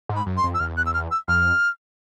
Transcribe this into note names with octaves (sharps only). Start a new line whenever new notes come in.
G#2
B5
F#2
C6
F2
E6
E2 F6
F#6
E6
F6
E6
F2 F6